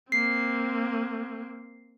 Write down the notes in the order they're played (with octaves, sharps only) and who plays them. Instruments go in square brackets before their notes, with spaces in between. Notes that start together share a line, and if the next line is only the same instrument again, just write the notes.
[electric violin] A#3 C4 [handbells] C7